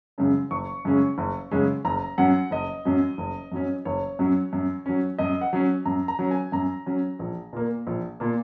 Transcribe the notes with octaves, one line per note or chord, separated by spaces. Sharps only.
F#2 C#3 G#3 C#4
F#1 C#6
F#2 C#3 G#3 C#4
F#1
F#2 C#3 G#3 C#4
F#1 A#5
F#2 F#3 C#4 F#5
F#1 D#5
F#2 F#3 C#4
F#1
F#2 F#3 C#4
F#1 C#5
F#2 F#3 C#4
F#2
F#3 C#4
F#2 D#5
F#5
F#3 C#4
F#2 A#5
A#5
F#3 C#4
G#5
F#2 A#5
F#3 C#4
A#1
A#2 A#3
A#1
A#2 A#3